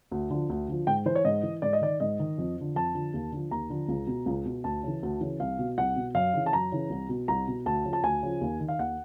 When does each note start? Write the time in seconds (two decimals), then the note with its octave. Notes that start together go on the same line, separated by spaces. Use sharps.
0.11 D2
0.30 D3 F3
0.50 D2
0.68 D3 F3
0.87 G#2 G5
1.06 E3 C5
1.15 C#5
1.25 G#2 D#5
1.43 E3
1.62 G#2 D5
1.73 D#5
1.81 D#3 D5
2.00 G#2 D#5
2.20 D#3
2.38 F2
2.57 D3 F3
2.75 F2 A5
2.95 D3 F3
3.14 D#2
3.32 D3 F3
3.51 D#2 A#5
3.70 D3 F3
3.88 C#2
4.07 B2
4.26 C#2
4.45 B2
4.64 D2 A5
4.83 C#3 E3
5.03 D2
5.21 C#3 E3
5.40 C2 F5
5.59 B2
5.78 C2 F#5
5.96 B2
6.15 F#2 F5
6.34 C#3 E3
6.46 A5
6.53 F#2 A#5
6.72 C#3 E3
6.90 C2
7.09 B2
7.28 C2 A#5
7.48 B2
7.66 D2 A5
7.85 C#3 F3
7.93 A5
8.03 D2 G#5
8.23 C#3 F3
8.41 D#2
8.60 D#3
8.68 F5
8.79 D#2 F#5